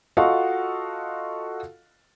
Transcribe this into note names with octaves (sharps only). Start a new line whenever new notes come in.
F4 F#4 A4 D#5 F5 F#5